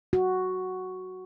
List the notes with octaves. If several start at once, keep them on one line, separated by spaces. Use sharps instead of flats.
F#4